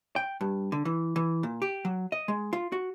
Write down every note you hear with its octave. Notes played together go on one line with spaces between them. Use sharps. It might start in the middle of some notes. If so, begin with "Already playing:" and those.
G5
G2
D3
E3
E3
A#2
G4
F#3
D#5
G#3
F4
F#4